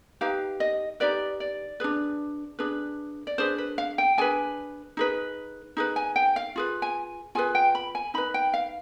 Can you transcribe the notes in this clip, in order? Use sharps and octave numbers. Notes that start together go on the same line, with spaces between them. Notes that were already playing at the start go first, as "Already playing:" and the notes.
D#4 G4 B4 F5
D#5
D#4 G4 B4 D5
D5
D4 G#4 B4
D4 G#4 B4
D5
D4 G#4 B4 C5
B4
F5
G5
D4 G#4 B4 G#5
D#4 G#4 B4
D#4 G#4 B4
G#5
G5
F5
F4 G#4 B4
G#5
F4 G#4 B4 G#5
G5
B5
G#5
D#4 B4 B5
G5
F5